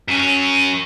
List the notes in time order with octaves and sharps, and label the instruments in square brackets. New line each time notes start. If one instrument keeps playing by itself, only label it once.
[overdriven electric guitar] F#2 C#4